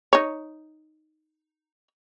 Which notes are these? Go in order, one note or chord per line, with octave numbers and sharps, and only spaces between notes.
D#4 C#5